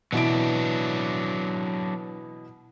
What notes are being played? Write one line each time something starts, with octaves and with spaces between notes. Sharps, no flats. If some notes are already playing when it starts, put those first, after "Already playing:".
B2 E3 F#3 D4 E5 D7